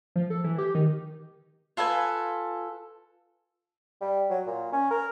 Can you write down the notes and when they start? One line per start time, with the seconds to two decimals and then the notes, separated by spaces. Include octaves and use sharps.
0.16 F3
0.30 A4
0.44 E3
0.58 G4
0.75 D#3
1.77 F4 A4 B4 G#5
4.01 G3
4.30 F#3
4.47 A#2
4.72 C#4
4.91 A#4